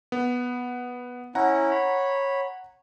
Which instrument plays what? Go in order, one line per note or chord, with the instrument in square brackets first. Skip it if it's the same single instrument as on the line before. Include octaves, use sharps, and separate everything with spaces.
[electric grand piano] B3
[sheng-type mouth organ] C#4 E4 [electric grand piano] F#5 A#5
[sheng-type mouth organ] C#5 B5